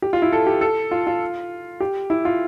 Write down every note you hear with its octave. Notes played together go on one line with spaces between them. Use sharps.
G4
F4
E4
A4
G4
A4
F4
F4
G4
E4
F4